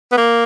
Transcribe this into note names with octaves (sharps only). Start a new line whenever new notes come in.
B3
A#3